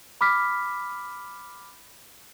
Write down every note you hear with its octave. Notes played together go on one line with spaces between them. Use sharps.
B5 D6 F6 B6